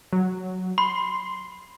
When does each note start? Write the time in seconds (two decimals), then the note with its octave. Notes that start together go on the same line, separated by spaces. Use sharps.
0.13 F#3
0.78 B5 C6